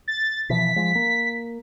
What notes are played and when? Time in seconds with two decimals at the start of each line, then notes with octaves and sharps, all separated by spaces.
0.08 A6
0.50 B2 E3 F3 B6
0.76 F3 G#3
0.95 A#3